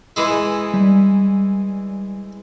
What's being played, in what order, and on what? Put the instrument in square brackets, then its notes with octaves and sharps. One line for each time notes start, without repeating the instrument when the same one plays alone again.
[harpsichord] E3 G#3 E4
[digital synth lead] G3